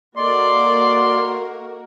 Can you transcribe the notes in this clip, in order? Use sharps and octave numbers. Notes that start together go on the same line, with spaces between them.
A#3 F#4 A4 A#4 D5 D#5 C6